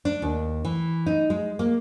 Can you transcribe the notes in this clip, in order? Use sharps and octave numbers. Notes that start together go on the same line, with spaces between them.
D4
D#2
E3
D#4
G#3
A#3